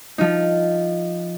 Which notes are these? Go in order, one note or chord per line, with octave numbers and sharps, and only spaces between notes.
F3 D#4